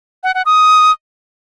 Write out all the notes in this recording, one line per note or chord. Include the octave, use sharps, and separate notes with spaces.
F#5
F#5
D#6